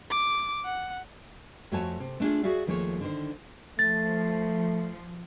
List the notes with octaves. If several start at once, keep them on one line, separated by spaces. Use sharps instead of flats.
D6
F#5
F2 A3 F#4 C#5 G#5 A5
C3
A3 B3 D4 D#4 F4 G#4
F#4 G#4 D5 E5 F5
D#2 F3 A3 G#4 A#4 C#5
D3 D#3 C5
F3 A3 A6